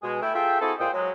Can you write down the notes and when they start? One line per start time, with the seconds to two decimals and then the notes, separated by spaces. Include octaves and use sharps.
0.02 B2 G#3 G#4
0.22 A3 E4 G5
0.35 F4 G#4 A4 E5 G5
0.61 C4 E4 F#4 G#4 A4
0.79 A#2 F4 G#4 C5 D#5 G5
0.93 F#3 G#3